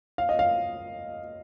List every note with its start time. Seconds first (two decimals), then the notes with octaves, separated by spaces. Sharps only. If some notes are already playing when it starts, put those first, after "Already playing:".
0.18 F5
0.29 D#5
0.39 F5